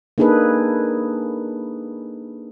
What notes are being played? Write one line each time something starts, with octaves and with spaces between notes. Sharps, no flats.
A#3 D4 D#4 G#4 A4 B4